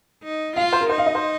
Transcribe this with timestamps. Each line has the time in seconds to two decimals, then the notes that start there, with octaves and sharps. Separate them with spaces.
0.23 D#4
0.56 F4 F5
0.73 C5
0.81 A#4
0.89 D#4 C5
0.98 F5
1.07 D#5
1.15 C5